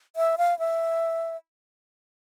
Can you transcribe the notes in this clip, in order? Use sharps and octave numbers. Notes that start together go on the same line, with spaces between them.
E5
F5
E5